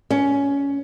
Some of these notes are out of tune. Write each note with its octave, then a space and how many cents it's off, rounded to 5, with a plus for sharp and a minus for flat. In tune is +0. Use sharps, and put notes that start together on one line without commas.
C#4 +15